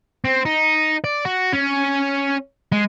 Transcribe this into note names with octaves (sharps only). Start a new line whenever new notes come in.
C4
D#4
D5
F#4
C#4
G#3